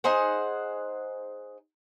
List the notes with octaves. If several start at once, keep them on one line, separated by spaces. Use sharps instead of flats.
D#4 G#4 C5 F#5